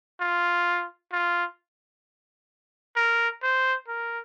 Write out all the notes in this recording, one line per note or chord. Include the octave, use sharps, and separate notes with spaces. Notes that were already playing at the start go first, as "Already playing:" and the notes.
F4
F4
A#4
C5
A#4